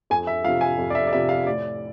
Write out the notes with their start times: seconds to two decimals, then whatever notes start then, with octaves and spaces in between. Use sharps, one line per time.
0.10 F2 G#5
0.27 E5
0.44 C3 F3 F5
0.61 G#5
0.78 F2
0.90 D5
0.95 E5
1.07 D5
1.13 C3 F3 E5
1.29 F5
1.46 A2 D5